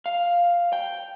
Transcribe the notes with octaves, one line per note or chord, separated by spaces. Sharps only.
F5
G5